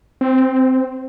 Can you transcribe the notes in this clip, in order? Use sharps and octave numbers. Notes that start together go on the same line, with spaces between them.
C4